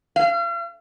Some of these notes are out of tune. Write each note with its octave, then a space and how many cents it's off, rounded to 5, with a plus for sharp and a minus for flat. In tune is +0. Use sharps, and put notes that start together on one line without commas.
F5 -40